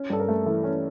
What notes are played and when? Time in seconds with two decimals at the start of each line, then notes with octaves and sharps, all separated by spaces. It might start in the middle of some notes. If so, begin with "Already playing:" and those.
Already playing: C#4
0.10 G2 A4
0.20 A#4
0.28 A3
0.46 E3 A4
0.64 C#4